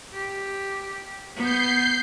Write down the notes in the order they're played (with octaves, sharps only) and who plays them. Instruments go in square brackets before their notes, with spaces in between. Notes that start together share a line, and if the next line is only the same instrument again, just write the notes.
[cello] G4
[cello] B3 [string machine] G6 C7